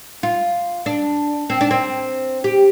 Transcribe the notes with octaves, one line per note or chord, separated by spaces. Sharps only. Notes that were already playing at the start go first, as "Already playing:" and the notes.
F4
D4
C4
D4
C4
G4